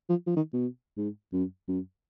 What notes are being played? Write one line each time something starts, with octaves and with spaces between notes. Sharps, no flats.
F3
F3
D#3
B2
G#2
F#2
F#2